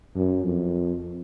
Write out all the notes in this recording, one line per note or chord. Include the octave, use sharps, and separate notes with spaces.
F#2
F2